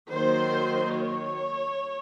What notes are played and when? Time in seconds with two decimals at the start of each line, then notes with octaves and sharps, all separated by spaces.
0.10 D#3 F#3 A#3 C5
0.94 C#5